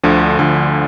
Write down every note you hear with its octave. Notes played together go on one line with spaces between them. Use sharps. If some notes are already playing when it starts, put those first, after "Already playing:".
D2 D3 F3
D2 D3 F3